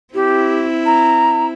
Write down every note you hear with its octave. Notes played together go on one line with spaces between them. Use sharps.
C4 E4 G4
A#5